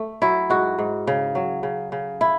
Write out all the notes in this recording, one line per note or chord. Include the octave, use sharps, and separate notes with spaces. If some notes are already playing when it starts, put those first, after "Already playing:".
Already playing: A3
F#3 E4
G#2 F#4
G#2
C#3
F#3
C#3
C#3
E4